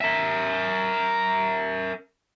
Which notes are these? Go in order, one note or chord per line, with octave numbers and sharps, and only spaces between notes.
A#4 E5